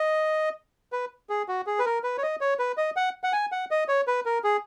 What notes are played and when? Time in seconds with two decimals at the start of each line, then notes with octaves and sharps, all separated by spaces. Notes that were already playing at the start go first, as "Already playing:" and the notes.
Already playing: D#5
0.92 B4
1.29 G#4
1.48 F#4
1.67 G#4
1.79 B4
1.86 A#4
2.04 B4
2.18 C#5
2.23 D#5
2.41 C#5
2.59 B4
2.77 D#5
2.96 F#5
3.24 F#5
3.33 G#5
3.52 F#5
3.71 D#5
3.88 C#5
4.07 B4
4.26 A#4
4.44 G#4